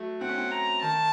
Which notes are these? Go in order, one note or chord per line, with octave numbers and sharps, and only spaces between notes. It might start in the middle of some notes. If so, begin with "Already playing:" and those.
Already playing: F#3 A3
C4 F#5
C#4
C4
A#5
D#3 A5